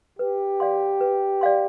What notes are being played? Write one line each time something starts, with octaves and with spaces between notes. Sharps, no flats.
G4 B4
D5 F5 C6
B4
D5 F5 C6